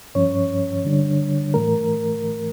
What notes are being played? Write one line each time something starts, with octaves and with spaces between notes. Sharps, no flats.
G2 F3 C#4 C#5
D3 G3 D4
A2 E3 A3 A#4